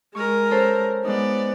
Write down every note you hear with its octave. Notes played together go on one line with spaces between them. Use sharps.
G#3 A#4 C#6
C#4 A4 C5
G#3 B3 D#4 D5